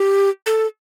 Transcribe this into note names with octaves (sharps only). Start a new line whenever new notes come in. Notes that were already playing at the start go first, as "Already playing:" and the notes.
Already playing: G4
A4